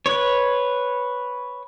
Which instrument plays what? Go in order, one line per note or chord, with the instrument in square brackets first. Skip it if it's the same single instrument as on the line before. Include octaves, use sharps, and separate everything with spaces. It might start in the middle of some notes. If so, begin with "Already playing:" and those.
[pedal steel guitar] B4 C#5